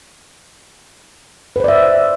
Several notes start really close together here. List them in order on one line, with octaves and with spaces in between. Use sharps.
B4 C5 D5 E5